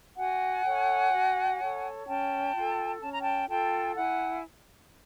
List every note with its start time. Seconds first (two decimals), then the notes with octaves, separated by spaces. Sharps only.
0.17 F#4 F#5 G#5
0.65 A4 C#5
1.12 F#4
1.59 A4 C#5
2.06 C#4 G5 A5
2.54 F4 A4
3.01 C#4 A5
3.11 A#5
3.20 G5 A5
3.48 F4 A4 G5 A5
3.96 E4 F#5 G#5